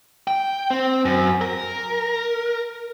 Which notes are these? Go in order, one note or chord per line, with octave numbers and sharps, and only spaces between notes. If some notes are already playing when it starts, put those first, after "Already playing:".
G5
C4
F#2
A#4